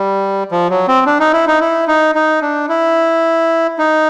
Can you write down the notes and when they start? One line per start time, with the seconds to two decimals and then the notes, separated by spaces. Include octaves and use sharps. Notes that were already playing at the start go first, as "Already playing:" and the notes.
Already playing: G3
0.52 F3
0.70 F#3
0.88 C4
1.06 D4
1.20 D#4
1.33 E4
1.47 D#4
1.60 E4
1.88 D#4
2.15 D#4
2.42 D4
2.69 E4
3.78 D#4